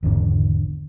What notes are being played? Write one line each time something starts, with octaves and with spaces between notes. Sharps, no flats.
G#1 E2 D3